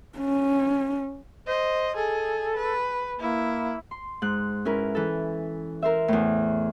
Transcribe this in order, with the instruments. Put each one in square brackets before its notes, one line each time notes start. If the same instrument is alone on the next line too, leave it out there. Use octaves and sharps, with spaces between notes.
[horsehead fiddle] C#4
[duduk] C5 [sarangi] D#5
[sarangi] G#4 [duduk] A4
[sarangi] B4
[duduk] A#3 [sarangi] E4
[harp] C6
G#2 F#6
C#4 E4 A#4 B4
E3 A4
A#4 C5 E5
E2 A2